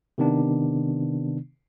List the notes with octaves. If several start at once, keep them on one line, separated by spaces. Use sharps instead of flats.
C3 D#3 B3 D4